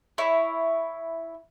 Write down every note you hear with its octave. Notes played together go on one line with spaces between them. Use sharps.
E4 C#5